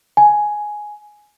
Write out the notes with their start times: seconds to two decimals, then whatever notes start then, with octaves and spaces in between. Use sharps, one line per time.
0.17 G#5